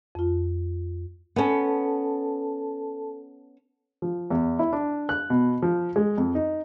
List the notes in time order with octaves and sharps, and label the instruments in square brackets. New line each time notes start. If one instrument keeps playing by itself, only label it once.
[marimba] F2 F4
[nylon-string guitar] B3 C#4 [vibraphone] A4 A5
[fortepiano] F3
E2
E4
D4
F#6
B2
F3
G#3
F2
D#4